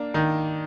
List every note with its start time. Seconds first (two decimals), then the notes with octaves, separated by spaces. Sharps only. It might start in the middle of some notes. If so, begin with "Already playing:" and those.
Already playing: A#3 D4
0.14 D#3 D#4